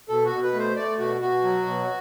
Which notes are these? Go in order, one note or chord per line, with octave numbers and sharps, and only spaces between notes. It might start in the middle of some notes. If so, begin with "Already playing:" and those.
B2 A4
F#4
B2
B4
A3
C5
A3 D5
B2 F#4
B2 F#4
F#3
B2